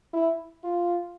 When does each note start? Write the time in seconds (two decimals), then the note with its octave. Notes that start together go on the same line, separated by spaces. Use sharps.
0.14 E4
0.64 F4